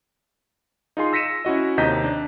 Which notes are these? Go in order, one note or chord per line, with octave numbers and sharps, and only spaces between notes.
D#4 F4 G#4 C6
E6 A#6 B6 C#7 D#7 E7
C#4 E4 F#4 D#5
D#2 C3 D#5 A#5 G6 B6
D4